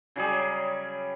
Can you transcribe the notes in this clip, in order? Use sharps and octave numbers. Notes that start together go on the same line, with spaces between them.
C#3 F#3 G3 G#4